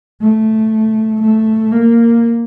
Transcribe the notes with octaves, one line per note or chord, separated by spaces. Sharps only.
A3
A3
A#3